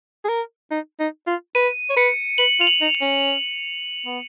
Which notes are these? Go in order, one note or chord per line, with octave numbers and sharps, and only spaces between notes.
G#4
A#4
D#4
D#4
F4
B4 D#7
C#5
B4 C#7
B4 F#7
F4 F7
F#7
D#4
F7
C#4
B3